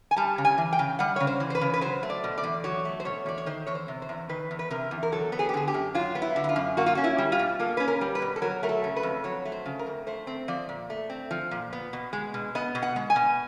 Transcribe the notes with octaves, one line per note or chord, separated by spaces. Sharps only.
G#5
G3 A5
C#3
G#5
E3
G5
C#3
G3 F#5
C#3 C#5
C5
E3
C5
B4
C#3
B4
F#3 C5
A3
D5
B2
D5
E2
F#3 C#5
A3
C5
B2 C#5
E2 D5
C#5
D#3 C5
E2 C#5
C5
C3
C5
E2
D#3 B4
E2
B4
C3 A#4
E2
A#4
F#3 A4
B3
G#4
G4
D3 G#4
G4
F#2
F#3 F4
B3
E4
D3
E4
F4
F#2
A#3 F#4
F4
C#4 F#4
E4
G3
F4
B2
A#3 A4
C#4 B4
A#4
G3
B4
B2
A4
F#3 A#4
A3 A#4
A4
C#3
B4
F2
F#3 C#5
A3
C5
C#3
A#4
F2
A3 C5
C4
F3 D5
A#2
A3
C4
F3
A#2
B3
B2
G#3
B2
B3 D#5
B2
F#5
G#3
G#5
B2